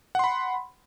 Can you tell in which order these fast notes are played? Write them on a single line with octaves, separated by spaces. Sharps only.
F#5 C6 B5